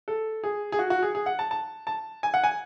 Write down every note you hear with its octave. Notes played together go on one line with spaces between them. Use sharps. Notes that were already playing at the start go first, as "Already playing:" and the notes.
A4
G#4
G#4
F#4
F#4
G#4
G#4
F#5
A5
A5
A5
G#5
F#5
G#5